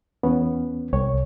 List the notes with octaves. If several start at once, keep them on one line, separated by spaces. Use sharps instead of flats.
E2 B3 C#4
C2 C#5